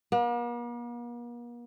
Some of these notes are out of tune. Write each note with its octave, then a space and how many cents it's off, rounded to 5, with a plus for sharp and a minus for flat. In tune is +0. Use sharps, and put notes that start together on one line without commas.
A#3 +45